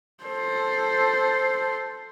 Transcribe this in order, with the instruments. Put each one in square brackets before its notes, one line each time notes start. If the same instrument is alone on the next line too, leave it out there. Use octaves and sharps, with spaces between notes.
[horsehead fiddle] A4 C5